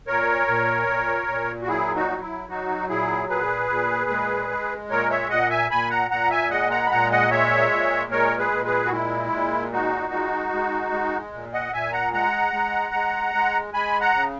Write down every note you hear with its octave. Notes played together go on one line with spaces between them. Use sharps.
A#2 A#4 C#5
A#2
A#2
A#2
F#4
F#3 E4 G#4
D#4 F#4
F#3
E4
F#3 D#4 F#4
A#2 E4 G#4
A#2 G#4 B4
A#2
G#3
G#3
A#2 A#4 C#5
C#5 E5
A#2 D#5 F#5
E5 G#5
A#2 G#5 B5
F#5 A#5
A#2 F#5 A#5
E5 G#5
G#3 D#5 F#5
F#5 A#5
B5
A#2 F#5 A#5
D#5 F#5
G#3 C#5 E5
A#2
G#3 A#4 C#5
G#4 B4
A#2
G#4 B4
F#4
G#3 E4
A#2
G#3 D#4 F#4
G#3
G#3
G#3
A#2
D#5 F#5
A#2 E5 G#5
F#5 A#5
G#3 F#5 A#5
G#3
G#3
G#3
G#3 G#5 B5
F#5 A#5
C#3